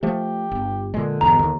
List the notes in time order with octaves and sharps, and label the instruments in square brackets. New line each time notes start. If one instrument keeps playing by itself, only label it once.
[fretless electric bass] F3 A3 [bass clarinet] G4
[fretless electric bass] G1
[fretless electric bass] A#2 G#3 [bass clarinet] D3
[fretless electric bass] G1 E2 B2 [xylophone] A#5
[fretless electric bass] D#2